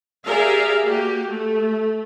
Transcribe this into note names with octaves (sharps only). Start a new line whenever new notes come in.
G4 G#4 A#4 D5 E5 F5
A#3 F#4 G4
A3